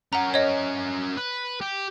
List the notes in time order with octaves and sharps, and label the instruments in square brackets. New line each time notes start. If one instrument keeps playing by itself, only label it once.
[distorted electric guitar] C#4 A#4 [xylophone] F#5 A#5
[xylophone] C#5 D#5
[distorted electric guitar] B4
G4